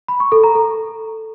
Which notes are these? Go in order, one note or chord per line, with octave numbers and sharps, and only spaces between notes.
B5
C#6
A4
A#5
A4